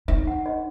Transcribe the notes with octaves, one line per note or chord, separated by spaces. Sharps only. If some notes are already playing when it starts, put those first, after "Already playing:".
D#4 E5
F#5
D#5